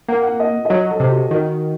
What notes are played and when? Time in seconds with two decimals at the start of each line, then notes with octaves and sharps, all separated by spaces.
0.08 A#3 F#5
0.23 F#5
0.40 D#5
0.65 D#5
0.70 F#3 C#5
0.90 A4
1.00 C3
1.10 F#4
1.31 D#3 F#4